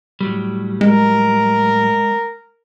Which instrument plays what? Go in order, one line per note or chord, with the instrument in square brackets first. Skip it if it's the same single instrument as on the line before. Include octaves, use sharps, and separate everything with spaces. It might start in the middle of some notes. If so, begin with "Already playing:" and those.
[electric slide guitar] A2 F#3 G3
[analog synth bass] G#3 [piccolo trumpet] A#4